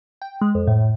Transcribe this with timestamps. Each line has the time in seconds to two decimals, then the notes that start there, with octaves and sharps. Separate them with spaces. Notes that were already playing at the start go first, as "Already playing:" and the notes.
0.22 G5
0.41 G#3
0.55 F2
0.67 A2